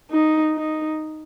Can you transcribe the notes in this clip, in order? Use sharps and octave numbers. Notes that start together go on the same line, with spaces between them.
D#4
D#4